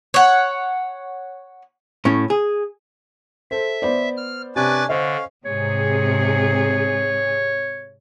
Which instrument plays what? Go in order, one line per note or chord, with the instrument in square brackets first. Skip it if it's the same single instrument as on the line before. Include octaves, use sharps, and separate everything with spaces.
[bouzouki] C#5 F#5
[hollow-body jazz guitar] A2 C#4
G#4
[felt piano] A4 C5 [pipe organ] E5
[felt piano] B3 C5 D5
[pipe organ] F6
[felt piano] C3 [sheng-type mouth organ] C#4 D4 G#5 [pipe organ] B4 D6 A6
[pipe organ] D3 [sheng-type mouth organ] C#4 F5 [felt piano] C5 D#5
[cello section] G#2 C3 G#4 [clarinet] C#5